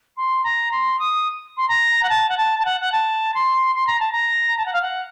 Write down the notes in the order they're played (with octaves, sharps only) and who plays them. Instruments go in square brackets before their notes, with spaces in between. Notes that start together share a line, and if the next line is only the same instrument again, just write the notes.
[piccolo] C6
A#5
C6
D#6
C6
A#5
F#5
A5
F#5
A5
A5
F#5
F#5
A5
C6
C6
A#5
A5
A#5
A5
F#5
F5
F#5